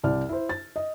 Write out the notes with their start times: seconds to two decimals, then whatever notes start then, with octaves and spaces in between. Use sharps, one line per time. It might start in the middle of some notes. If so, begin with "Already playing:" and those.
0.04 C2 D5 F6
0.29 E4 C5
0.49 A6
0.76 D#5